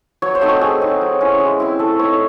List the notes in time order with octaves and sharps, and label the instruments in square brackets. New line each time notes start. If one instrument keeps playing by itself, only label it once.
[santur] F#3 C#5
C5
A3 C4 D#4
F#4
F#3 G#4
C4 D#4
F#3
C#4 E4
G#3
C4 E4
A3 A4
C4 D#4 C#5